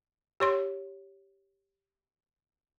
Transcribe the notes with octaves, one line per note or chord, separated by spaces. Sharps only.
G4 C#5 C6